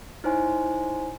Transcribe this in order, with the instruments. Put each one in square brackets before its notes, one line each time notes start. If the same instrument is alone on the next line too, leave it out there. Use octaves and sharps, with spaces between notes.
[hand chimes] D#4 E4 C5 C#5 G#5 C6